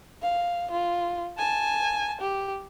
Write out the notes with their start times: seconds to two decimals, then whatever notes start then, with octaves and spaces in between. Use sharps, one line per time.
0.22 F5
0.71 F4
1.38 G#5 A5
2.21 G4